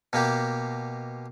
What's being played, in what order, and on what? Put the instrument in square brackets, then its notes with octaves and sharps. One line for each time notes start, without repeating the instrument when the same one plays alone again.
[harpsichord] B2 A#3 G4